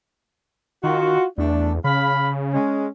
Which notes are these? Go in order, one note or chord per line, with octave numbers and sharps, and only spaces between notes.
D#3 F4 F#4
E2 A3 D4
C#3 F5 B5
G#3 C#4